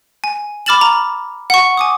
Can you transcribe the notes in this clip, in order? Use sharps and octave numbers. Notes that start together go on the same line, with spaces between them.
G#5
B5 D6 F6 A6 E7 F#7
A#5
F#5 C#6
G#5 D6 D#6